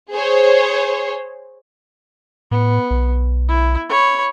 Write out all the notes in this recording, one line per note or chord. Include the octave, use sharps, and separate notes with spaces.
G#4 C5 C#5
A2 B3
B1
E4
C#5 B5